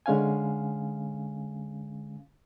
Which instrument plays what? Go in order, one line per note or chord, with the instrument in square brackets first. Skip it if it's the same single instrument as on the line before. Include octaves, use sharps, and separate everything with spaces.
[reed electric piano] D3 G#3 C#4 F5 G#5